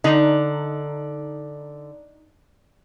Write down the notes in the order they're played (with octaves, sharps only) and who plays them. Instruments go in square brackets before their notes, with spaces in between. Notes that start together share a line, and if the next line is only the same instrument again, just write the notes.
[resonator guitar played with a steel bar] D3 [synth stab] D#4